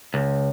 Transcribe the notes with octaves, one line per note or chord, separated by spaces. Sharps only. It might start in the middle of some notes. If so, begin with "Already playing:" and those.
C#2